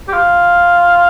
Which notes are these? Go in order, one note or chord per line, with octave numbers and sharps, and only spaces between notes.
G4
F4